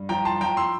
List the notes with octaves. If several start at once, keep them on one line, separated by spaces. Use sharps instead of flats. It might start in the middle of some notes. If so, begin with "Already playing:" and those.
Already playing: G2
F3 G5 A#5
A5 C6
F3 G5 A#5
C6 E6